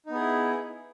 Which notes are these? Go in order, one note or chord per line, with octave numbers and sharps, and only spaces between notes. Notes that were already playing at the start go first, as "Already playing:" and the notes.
B3 D#4 E4 G#4